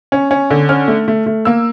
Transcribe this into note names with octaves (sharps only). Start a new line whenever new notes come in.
C#4
C#4
D3
C#4 F6
A3
A3
A3
A#3 E6